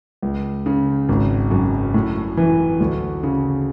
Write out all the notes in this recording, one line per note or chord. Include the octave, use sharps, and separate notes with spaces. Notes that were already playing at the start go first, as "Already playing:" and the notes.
C#2
C#3
G#1
F#2
A2
E3
D2
C#3